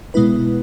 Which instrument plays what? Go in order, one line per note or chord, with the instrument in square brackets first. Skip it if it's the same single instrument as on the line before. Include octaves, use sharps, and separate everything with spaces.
[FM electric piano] B2 G#3 B3 E4 B4